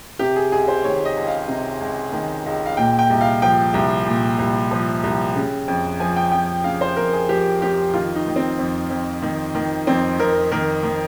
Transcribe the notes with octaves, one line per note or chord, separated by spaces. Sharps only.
C3 G4
G#4
C#2 G#4
C5
D#3 C#5
D#5
C#2
F5
C3
C#2
D#3
C#2
F5
A#2 G5
G5
C2
F5
F3 G5
C2
A#2
C2
F3
C2
C#3
F2
F3 G#5
G5
F2 G5
C#3 F5
C5
F2 A#4
G#4
F3 G4
F2 G4
D#3 F4
D#4
D#3
C4
F2
F2
D#3
D#3
F2 C4
F2 A#4
D#3 A#4
D#3